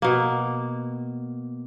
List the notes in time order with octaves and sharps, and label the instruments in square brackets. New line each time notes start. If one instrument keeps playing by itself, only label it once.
[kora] B2 A#3